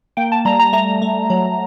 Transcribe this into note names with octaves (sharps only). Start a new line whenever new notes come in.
A#3 G5
A5
G3 A#5
A#5
A3 A#5
A3
F#3